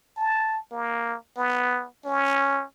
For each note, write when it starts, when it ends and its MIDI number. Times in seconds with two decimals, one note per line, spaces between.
0.17 0.61 81
0.72 1.17 58
1.37 1.87 59
2.05 2.64 61